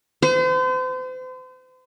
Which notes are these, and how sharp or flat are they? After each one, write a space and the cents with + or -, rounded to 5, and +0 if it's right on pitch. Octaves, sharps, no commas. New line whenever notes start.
C5 -40